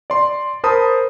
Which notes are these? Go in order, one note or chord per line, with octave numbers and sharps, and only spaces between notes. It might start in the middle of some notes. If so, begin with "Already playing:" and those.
D5 C6
A#4 C5 A5 B5 D#6